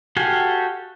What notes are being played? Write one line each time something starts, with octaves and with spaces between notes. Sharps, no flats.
F#4 G4 A4 F5 G#5